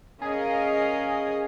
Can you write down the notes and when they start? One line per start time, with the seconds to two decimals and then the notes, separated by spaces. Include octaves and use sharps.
0.22 C#4 G#4 A#4 D#5 F5